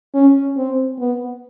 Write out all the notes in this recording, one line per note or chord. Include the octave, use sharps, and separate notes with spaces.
C#4
C4
B3